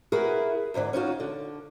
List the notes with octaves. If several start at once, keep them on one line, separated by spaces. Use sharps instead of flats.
E4 F#4 G#4 A#4 B4
E2 G#2 D3 E3
C#4 D#4 F4 F#4
D3